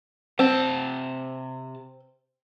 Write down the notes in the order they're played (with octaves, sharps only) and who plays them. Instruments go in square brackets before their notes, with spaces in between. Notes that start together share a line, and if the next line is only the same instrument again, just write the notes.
[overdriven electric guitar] C3 A5 [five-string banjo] C4